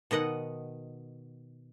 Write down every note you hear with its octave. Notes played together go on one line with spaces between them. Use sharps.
B2 D#3 D#5 F#5